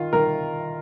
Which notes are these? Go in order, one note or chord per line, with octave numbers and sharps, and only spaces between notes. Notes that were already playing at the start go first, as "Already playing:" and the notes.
Already playing: D#3 F4
D#3 A#4